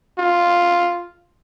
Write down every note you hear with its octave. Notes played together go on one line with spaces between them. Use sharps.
F4